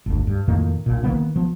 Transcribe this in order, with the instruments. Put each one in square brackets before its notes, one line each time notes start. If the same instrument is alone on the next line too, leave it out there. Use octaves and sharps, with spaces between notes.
[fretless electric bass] G1 D2
G2
F2 A2 D#3 A#3
A#1 A#2
D#3 F3 A#3 B3
F3 B3